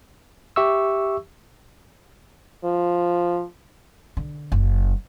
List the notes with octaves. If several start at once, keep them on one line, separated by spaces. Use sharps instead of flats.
G4 E5 C#6 E6
F3
D3
F#1